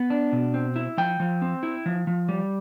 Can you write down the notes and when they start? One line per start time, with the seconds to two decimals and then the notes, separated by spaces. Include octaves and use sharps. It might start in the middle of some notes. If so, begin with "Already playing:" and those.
Already playing: B3
0.10 D4
0.33 B2
0.54 C4
0.76 E4
0.98 F3 G5
1.20 F3
1.42 C4
1.63 E4
1.86 F3
2.07 F3
2.29 G3